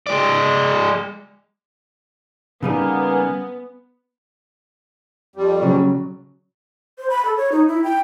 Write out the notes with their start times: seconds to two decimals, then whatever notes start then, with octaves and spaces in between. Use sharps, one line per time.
0.07 G#3 D5
2.63 C#3 G3 A#3 B3 D#4 G#5
5.36 F2 G3
5.62 C#3 F#3
6.98 C5
7.10 B5
7.25 A4
7.37 C#5
7.52 D#4
7.68 E4
7.84 G5